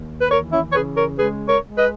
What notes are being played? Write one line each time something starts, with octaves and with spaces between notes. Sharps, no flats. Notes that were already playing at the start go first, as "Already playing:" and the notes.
Already playing: D#2
B4
E3 A#4 C#5
C#4 E4
C#5
C#3 G#4 B4
A#4 C#5
G#3 G#4 B4
A#4 C#5
G#3
B4 D#5